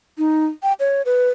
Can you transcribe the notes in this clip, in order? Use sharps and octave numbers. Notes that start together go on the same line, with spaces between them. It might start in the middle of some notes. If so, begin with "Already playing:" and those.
D#4
G5
C#5
B4